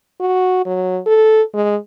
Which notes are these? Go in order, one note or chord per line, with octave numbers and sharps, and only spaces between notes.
F#4
F#3
A4
G#3